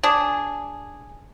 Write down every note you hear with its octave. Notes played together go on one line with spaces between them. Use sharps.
D4 G#4